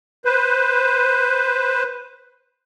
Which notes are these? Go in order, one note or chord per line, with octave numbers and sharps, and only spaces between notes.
B4 C5